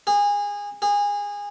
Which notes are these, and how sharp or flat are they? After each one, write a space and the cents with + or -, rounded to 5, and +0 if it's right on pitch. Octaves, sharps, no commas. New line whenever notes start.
G#4 -25
G#4 -25